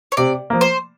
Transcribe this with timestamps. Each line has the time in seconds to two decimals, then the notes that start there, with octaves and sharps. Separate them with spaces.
0.12 C#5
0.17 C3 D5
0.50 F3 A#3
0.61 C5